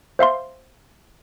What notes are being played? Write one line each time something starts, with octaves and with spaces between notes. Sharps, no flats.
C5 E5 F5 C6